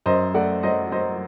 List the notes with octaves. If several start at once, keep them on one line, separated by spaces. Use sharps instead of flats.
F#2 C5 D#5
A3 D5 F#5
F#3 C5 D#5
F#3 C5 D#5